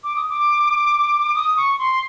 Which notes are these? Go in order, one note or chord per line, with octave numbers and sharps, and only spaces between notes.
D6
D#6
D6
D#6
C#6
C6